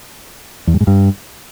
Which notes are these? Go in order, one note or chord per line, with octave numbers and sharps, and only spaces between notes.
E2
G2
G#2
G2